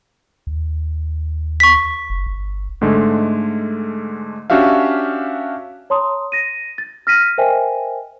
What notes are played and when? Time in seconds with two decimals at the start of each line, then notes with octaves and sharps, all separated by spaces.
0.47 D#2
1.60 C#6 B6
2.10 F#1
2.27 G1
2.81 G#2 D3 G#3 A3
4.50 C#4 D4 F#4 G4 E5 F5
5.90 C#5 A5 A#5 C6 D#6
6.32 A#6 D#7
6.78 A6
7.07 F6 A#6 B6 D#7
7.38 A#4 C5 D#5 E5 G5 G#5